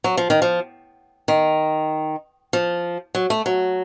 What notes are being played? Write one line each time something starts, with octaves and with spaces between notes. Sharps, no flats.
F#3
F3
D#3
F3
D#3
F3
F#3
A3
F#3